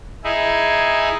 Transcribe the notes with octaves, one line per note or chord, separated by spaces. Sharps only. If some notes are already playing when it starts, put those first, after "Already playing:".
D#4 E4 G#4